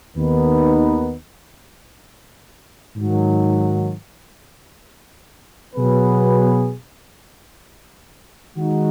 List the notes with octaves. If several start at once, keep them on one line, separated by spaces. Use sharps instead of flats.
D#2 D#3 B3 D#4 B4
G#2 D#3 F#3
B2 F#3 B3 G#4 B4
D#3 G#3 D#4 F#4